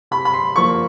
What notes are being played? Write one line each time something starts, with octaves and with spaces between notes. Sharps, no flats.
C3 B5
B5
C6
F3 A#3 C#6